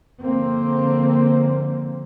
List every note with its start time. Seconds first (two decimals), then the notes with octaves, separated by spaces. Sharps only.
0.21 D3 F3 A#3 C4